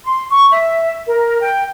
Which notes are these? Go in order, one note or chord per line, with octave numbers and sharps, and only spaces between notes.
C6
C#6
E5
A#4
G5